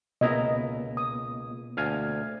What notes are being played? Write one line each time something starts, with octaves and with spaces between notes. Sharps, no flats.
C#2 B2 A#3 B3 E4 D#5 A#5
D#6
D2 F5 G#5